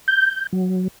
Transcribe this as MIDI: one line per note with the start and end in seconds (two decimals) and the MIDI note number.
0.08 0.47 91
0.53 0.88 54